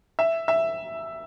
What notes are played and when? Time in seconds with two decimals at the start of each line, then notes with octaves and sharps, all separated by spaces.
0.19 E5
0.48 E5